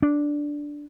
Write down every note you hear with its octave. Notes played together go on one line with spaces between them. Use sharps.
D4